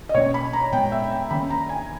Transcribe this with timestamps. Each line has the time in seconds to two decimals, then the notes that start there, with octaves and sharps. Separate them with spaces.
0.09 D#5
0.15 B2 A#3 C#4 C#5
0.34 B5
0.53 A#5
0.73 A#2 G#3 B3 G5
0.92 E5
1.11 G5
1.30 D#3 A#3 C#4 B5
1.50 A#5
1.69 G#5